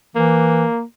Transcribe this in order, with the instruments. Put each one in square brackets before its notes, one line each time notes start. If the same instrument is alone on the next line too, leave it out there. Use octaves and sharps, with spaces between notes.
[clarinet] E3 [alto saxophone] A#3